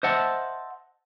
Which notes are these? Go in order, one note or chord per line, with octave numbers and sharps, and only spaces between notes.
C5 D#5 E5 F#5 A5